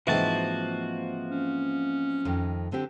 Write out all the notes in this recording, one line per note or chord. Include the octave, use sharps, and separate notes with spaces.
G#2 E3 F3 A#3 C4 F#4 E5 A5
C#4
F2 D#3
D3 C4 G4